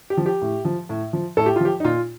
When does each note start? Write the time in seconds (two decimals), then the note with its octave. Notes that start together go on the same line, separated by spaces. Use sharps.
0.10 G4
0.17 F3
0.26 G4
0.42 A2
0.65 F3
0.89 A2
1.13 F3
1.37 A2 A4
1.46 G4
1.56 F4
1.60 F3 G4
1.80 D#4
1.84 A#2 F4